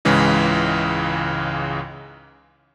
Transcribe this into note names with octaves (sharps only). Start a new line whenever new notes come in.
C#2 G#2 C#3 E3 G#3